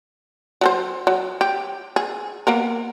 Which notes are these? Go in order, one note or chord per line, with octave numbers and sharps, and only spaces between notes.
F#3 A4 C5
F#3
G4
G#4
A#3 B3 A#4